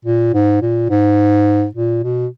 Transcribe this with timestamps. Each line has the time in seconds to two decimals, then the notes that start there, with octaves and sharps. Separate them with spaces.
0.05 A#2
0.34 G#2
0.62 A#2
0.90 G#2
1.75 A#2
2.03 B2